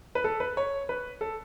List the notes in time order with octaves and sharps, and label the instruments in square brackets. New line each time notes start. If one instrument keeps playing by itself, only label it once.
[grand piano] B4
A4
B4
C#5
B4
A4